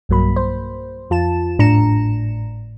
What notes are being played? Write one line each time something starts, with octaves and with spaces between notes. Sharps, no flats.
B1 G2 F#3 A#3 B5
C5
F2 F4 A5 E7
G#1 A2 D4 A#5 C#7 E7